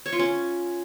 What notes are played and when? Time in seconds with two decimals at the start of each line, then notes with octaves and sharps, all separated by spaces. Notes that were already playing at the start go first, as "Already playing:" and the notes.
0.06 C#5
0.12 F4
0.19 C#4